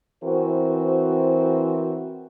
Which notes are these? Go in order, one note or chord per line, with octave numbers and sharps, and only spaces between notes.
E3 C4 F#4 A#4 C5